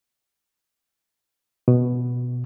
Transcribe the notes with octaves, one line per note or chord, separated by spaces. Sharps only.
B2